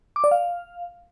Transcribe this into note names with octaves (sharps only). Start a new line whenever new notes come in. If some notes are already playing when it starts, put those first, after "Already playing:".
D6
D5
F5